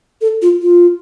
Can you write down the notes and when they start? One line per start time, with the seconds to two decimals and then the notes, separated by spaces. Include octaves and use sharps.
0.21 A4
0.42 F4
0.62 F4